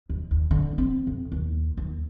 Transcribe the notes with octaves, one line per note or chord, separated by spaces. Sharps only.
D#2
D#2
D3
C4
F2
D#2
D#2